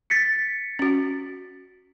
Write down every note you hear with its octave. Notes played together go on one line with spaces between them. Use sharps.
A6 B6 C#7
C#4 F#4